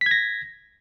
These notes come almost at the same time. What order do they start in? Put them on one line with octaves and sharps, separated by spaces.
B6 G#6 A#6